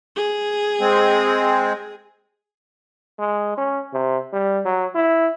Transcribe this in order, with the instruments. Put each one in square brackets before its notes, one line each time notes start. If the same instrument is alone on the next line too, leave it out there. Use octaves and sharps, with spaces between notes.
[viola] G#4
[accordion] G#3 C4
[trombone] G#3
C#4
C3
G3
F#3
E4